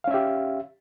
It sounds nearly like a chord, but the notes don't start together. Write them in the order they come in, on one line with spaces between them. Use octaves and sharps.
F5 C#4 E5 G4